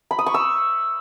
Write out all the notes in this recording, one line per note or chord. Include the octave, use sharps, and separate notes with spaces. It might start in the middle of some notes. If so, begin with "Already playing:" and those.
B5
D#6
C#6
E6